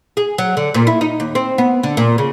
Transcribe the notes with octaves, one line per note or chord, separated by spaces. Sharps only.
G#4
F#3
D3
A#2
E4
D#4
D#2
C4
B3
D3
A#2
C#3